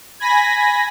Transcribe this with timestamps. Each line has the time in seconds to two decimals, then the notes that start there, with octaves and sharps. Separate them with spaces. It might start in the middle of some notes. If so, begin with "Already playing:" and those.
0.20 G#5 B5 A#6 B6